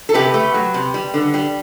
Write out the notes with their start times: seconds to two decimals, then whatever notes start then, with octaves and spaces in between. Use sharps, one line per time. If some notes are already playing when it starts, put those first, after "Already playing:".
0.09 A4
0.14 C3 G4 B4
0.34 A3
0.54 F#3
0.74 C3
0.94 G3
1.14 D3
1.34 G3